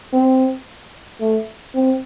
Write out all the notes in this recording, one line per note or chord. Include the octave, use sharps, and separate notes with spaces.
C4
A3
C4